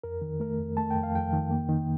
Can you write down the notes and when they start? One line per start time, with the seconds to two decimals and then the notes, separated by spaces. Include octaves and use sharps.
0.04 F2 A#4
0.22 D#3
0.40 A3 A#4
0.59 F2
0.77 A3 A5
0.91 F2 G5
1.03 F5
1.14 F2 G5
1.33 D#3
1.51 A#3
1.69 D#3